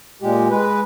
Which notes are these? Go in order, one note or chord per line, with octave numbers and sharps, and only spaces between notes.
A#2 G#3 G4
G#3 B4